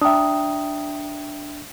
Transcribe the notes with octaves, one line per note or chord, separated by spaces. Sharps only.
D4 E5 G5 A#5 D#6